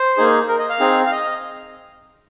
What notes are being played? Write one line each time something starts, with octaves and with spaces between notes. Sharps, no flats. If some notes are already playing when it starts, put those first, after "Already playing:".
Already playing: C5
A#3 D#4 G#4
A#4
D#5
F5
C4 D#4 G#4
F5
D#5